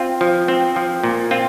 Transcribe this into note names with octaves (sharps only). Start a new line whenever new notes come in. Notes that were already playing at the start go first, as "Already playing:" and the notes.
Already playing: C4 F4
F3
C4
F3
A#2
C4 F4